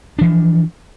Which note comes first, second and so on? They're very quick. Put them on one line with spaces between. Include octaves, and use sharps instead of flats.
D4 E3 F3